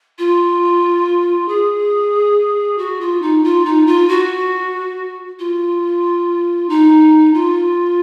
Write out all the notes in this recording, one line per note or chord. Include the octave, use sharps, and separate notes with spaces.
F4
G#4
F#4
F4
D#4
F4
D#4
F4
F#4
F4
D#4
F4